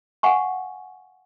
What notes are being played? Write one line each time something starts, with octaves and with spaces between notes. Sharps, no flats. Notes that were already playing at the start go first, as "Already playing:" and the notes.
F5 F#5 G#5 C#6